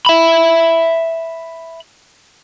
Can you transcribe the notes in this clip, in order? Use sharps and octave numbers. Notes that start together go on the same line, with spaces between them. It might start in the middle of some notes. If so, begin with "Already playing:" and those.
E5 B5